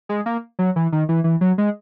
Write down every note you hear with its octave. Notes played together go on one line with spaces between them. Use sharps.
G#3
A#3
F#3
E3
D#3
E3
E3
F#3
G#3